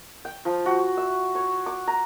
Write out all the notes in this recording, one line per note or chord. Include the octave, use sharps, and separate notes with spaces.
G5
F3
F#4
E5
C#5
D6
A#5